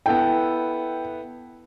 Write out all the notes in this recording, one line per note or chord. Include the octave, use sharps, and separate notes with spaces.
B3 E4 A4 G5